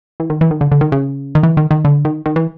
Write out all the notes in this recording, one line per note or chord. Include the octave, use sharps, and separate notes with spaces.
E3
D#3
E3
D#3
D3
D3
D#3
C#3
D#3
E3
D#3
D#3
D3
D#3
D#3
E3